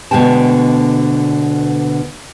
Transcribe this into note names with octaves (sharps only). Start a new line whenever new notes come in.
D2 B2 D3 G#3 G5 A5